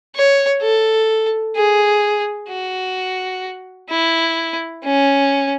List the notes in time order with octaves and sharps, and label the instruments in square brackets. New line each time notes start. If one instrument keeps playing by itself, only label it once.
[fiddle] C#5
A4
G#4
F#4
E4
C#4